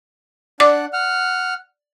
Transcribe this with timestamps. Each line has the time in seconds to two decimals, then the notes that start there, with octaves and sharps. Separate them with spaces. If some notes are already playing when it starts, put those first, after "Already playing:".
0.60 D4 D5 F#5 D6
0.93 F#5 F6